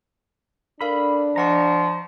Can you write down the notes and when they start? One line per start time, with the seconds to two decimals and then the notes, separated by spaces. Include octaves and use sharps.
0.81 D4 A4 A#4 F5 B5
1.36 F3 D#5 F#5 A#5 C#6